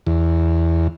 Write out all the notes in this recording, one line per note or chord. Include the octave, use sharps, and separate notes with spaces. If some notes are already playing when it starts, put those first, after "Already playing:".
E2